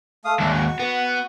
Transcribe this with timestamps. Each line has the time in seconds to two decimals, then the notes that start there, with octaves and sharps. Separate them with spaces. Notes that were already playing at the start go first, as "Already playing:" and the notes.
0.25 A3 F5 D#6
0.40 D#2 G#3 D4 E5
0.51 F#4 C#6
0.79 B3